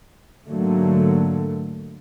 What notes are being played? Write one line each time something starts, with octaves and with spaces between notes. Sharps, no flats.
G#2 D3 F#3 A3 A#3